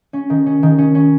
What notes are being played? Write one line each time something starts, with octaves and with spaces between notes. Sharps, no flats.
C#4
D#3
C#4
D#3
C#4
C#4